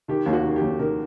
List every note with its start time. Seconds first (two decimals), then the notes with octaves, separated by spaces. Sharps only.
0.08 D#3 G4
0.26 D#2
0.33 F#4
0.44 D#3
0.56 G4
0.61 D#2
0.79 D#3 A#4